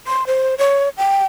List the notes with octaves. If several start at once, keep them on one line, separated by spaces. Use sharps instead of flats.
C6
C5
C#5
G5